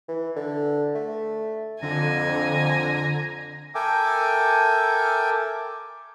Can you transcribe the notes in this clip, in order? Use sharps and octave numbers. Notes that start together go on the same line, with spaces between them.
E3
D3
A3
F2 D3 G#5 A#5
A4 A#4 E5 G5 G#5 D6